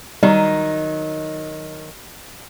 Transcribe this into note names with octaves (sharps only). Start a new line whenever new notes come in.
D#3 F#3 G3 D#4